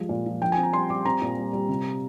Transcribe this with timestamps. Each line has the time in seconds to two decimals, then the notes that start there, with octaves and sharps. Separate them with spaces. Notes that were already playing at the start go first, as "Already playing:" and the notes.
Already playing: F3 G3 G#3
0.09 A#2
0.26 F3
0.42 A#1 G5
0.52 G#5
0.57 C4
0.63 A#5
0.73 G3 C6
0.90 G3 D6
1.05 C4 A#5
1.22 A#2
1.38 G3
1.53 G3
1.69 C3